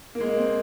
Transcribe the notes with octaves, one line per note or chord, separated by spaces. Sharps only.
A#3
G#3
A#3
C4